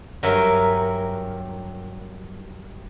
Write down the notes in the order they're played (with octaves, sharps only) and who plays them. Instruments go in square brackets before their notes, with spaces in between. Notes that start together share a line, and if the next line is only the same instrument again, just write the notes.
[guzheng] G2 F#3 A#4 E5 G#5